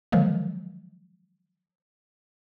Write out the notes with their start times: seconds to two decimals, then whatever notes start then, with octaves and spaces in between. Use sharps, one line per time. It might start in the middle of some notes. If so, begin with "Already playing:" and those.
0.12 D3 D#3 F3 F#3 G#3 A#3